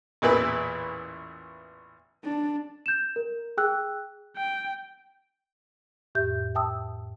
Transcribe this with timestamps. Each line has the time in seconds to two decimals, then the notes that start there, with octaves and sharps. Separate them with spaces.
0.22 A1 E2 A#2 E3 E4 B4
2.24 D4
2.86 G6 E7
3.16 A#4
3.57 G#4 G5 E6 F#6
4.37 G5
6.15 F2 A2 G4 E5 G6
6.55 E5 G5 A5 D#6 E6